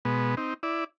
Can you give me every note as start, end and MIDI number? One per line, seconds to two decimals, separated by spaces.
0.05 0.35 47
0.05 0.35 56
0.05 0.35 59
0.37 0.54 60
0.37 0.54 63
0.63 0.84 64
0.63 0.84 74